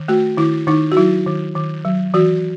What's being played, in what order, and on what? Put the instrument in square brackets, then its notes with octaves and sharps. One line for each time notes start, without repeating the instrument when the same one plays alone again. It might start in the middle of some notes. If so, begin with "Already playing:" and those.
Already playing: [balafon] D#3
A3 F#4
D#3 E4
D#3 D#4
F#4
F#3 E4
D#3
D#3
F#3
E3 F#4